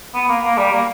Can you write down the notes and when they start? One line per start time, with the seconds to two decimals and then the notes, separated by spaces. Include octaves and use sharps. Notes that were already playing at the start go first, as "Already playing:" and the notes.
0.14 B3
0.29 A#3
0.44 A#3
0.57 G3
0.72 A#3